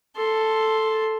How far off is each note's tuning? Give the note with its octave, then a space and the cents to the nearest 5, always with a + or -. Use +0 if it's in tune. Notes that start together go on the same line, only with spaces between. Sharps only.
A4 +0 C6 +0